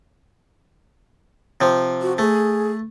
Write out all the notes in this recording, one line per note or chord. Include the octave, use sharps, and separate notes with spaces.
C3 F3
F#4
A3 G#4